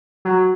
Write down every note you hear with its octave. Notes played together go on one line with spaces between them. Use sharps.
F#3